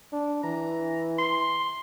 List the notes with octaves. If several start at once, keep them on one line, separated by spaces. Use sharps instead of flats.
D4
E3 A#5
C6